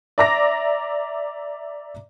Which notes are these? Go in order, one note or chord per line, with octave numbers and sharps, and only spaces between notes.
D5 E5 A#5 D6 A#6